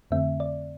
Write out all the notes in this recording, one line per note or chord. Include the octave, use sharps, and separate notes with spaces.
F2 D3 A3 C4 E5
D5